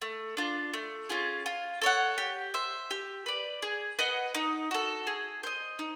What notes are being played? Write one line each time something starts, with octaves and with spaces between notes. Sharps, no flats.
A3
D4 F4
A3
C#4 F4 G#4
F4
A4 C#5 F#5
G4
C5 E5
G4
B4 D5
G#4
B4 D#5 F#5
D#4
F#4 A4
G#4
C5 D#5
D#4